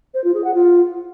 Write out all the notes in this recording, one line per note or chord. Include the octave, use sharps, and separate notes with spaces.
C5
F4
G#4
F#5
F4